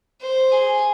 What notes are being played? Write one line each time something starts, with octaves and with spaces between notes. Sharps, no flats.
C5
G#4